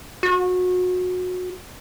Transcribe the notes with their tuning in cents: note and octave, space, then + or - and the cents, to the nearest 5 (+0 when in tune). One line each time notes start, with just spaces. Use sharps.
F#4 -25